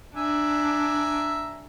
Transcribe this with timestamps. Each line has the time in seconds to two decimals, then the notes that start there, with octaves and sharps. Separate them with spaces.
0.16 D4 E5 G#5 A#5